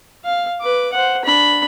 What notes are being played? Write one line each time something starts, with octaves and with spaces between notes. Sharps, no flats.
F5
B4 D6
C5 F#5
D4 B5